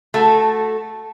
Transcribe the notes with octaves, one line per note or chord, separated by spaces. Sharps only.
A3 F#4 A4